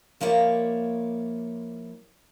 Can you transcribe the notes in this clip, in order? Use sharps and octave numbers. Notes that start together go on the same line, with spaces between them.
F3 A#3 E4 C#5 D5